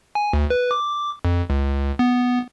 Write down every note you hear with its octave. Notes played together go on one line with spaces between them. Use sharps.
G#5
D2
B4
D6
F2
C#2
B3